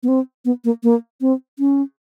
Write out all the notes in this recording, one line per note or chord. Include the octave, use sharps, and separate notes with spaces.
B3
C4
B3
A#3
A#3
C4
C#4